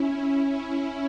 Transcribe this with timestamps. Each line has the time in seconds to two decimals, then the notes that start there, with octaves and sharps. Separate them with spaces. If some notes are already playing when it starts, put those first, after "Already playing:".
Already playing: C#4 E4
0.44 C#4 E4